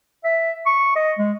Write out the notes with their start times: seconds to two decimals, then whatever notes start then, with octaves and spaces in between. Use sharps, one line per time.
0.24 E5
0.66 C#6
0.96 D#5
1.18 G#3